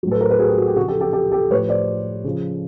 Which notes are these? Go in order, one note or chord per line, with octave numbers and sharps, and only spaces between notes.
A2 F#3
A4 B4
A#4 C5
A4 B4
F#4 G#4
G4
F#4
G4
C#3 F3 F#4 G#4
G4 A4
G4 A4
G4 A4
G4 A4
A2 F3 B4 C#5
C5 D5
C#3 F3